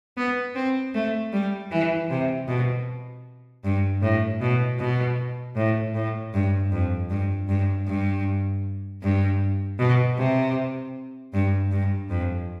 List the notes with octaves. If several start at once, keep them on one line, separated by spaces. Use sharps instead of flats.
B3
C4
A3
G3
E3
C3
B2
G2
A2
B2
B2
A2
A2
G2
F2
G2
G2
G2
G2
B2
C3
G2
G2
F2